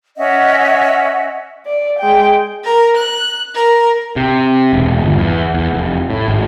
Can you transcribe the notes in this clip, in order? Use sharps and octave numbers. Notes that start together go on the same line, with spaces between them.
C#4 D#5 E5 F#5
D5
G#3 G5
A#4
F#6
A#4
C3
E1
G1
E2
E2
F1
A2
G#1